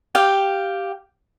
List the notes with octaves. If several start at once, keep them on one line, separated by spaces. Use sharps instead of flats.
G4 F5 G5